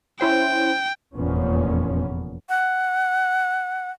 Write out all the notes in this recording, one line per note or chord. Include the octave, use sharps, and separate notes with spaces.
C#4 E4 C5 G5
F1 E2 A#2 F3 B3 C#4
F#5